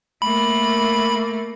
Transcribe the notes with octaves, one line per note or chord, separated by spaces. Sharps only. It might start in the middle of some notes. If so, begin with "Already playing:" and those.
A3 A#3 B5